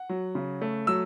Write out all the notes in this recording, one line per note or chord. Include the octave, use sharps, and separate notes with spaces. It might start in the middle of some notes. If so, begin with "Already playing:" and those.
Already playing: F#5
F#3
C#3
A3
F#3 E6